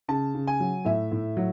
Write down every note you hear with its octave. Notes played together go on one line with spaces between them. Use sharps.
C#3 A5
C#3
G#5
F#3
A2 E5
A2
F#3